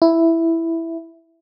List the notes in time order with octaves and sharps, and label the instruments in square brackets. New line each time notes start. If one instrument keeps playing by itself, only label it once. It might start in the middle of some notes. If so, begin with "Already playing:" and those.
[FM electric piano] E4